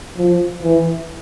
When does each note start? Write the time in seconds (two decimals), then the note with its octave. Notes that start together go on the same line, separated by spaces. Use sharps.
0.17 F3
0.63 E3